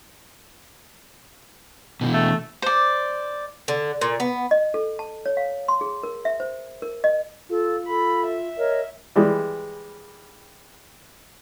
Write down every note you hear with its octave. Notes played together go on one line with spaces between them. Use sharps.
B2 D#3 E3
A3
C5 D5
D3
A#2
B3
D#5
A4
A5
C#5
F5
C6
G#4
A#4
E5
C5
A#4
D#5
F4 A4
A4 B5
E5
A#4 C#5 D#5
E3 G3 G#3